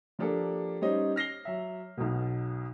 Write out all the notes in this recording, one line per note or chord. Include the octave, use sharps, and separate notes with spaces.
F3 A#3 D4 G4 A4
G3 C#4 D#4 C5 C#5 D#5
F6 A#6 C7 G7
F#3 E5
B1 B2